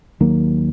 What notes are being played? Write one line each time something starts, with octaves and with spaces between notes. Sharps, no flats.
D#2 D#3 F#3 A#3